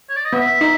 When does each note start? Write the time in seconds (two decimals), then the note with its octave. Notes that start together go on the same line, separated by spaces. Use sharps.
0.10 C#5
0.16 D5
0.25 D#5
0.33 B3 E5
0.61 D#4